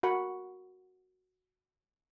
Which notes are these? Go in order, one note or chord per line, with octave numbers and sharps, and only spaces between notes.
F#4 A#4 F#5 B5